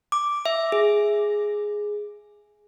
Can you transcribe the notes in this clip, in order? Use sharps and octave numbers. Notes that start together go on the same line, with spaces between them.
D6
E5
G#4